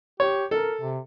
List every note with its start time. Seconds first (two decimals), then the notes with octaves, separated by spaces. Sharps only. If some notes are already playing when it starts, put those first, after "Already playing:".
0.20 G4 C#5
0.51 A4 A#4
0.80 C3